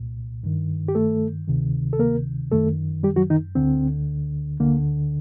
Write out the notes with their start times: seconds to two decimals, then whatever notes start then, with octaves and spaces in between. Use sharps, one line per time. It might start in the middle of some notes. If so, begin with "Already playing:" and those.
Already playing: C2 A#2
0.43 G2 D#3
0.88 G4
0.95 A3 A4
1.48 D2 C3 D#3
1.93 A4
1.99 A#3 A#4
2.52 F#2 D#3 A3 A4
3.03 G3 G4
3.16 F#3 F#4
3.30 D#3 D#4
3.55 D2 D3 C4
4.60 D2 D3 A#3